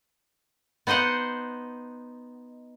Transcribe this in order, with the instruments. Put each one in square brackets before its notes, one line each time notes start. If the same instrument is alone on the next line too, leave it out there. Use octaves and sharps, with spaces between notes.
[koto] B3 D#4 C5 D#5 F#5